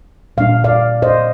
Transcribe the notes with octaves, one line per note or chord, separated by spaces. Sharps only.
A#2 G3 D4 F5
D5 F5
C5 D#5